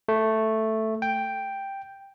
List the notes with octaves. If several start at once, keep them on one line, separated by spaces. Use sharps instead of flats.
A3
G5